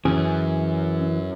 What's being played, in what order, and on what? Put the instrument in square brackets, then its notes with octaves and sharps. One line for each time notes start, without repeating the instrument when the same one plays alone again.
[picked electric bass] F#2 [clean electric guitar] E3 G#4 [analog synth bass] C#4